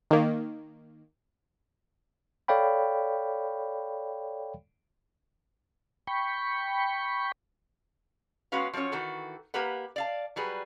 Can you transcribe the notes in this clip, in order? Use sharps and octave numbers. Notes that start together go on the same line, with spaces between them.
D#3 A#3
A4 C#5 D5 F5 G5 B5
G5 B5 C#6
G#3 B3 C#4 F#4 B4 F5
F3 F#3 C4 C#4 C#5
D#3 E3 F#4 A4
A#3 G4 A#4 B4 F#5
D5 F5 A5
F#3 G3 G#4 B4